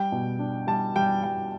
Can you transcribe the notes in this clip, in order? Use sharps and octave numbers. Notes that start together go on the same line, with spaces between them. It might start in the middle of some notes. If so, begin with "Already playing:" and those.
Already playing: G3 G5
B2
D4
G3 A5
G3 G5
G3 G5